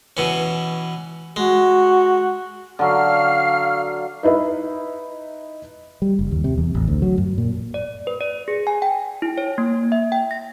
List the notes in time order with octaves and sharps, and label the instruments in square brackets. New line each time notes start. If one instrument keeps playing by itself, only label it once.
[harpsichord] B2 E3 C#4
[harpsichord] G#3 [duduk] F#4
[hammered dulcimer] D3 F#3 [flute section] F5 F6
[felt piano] D#4 E4 B4 D#5 E5
[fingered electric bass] G3
F#1
D#2
C3
E2
A1
D2
F#3
F#2
A#2
[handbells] D5
B4
D5
G#4
G#5
G5
E4
C#5
A#3
E5
G5
A#6